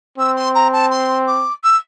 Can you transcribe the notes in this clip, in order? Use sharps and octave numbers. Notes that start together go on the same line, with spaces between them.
C4 E6
C6
A#5
A5
C6
D6
E6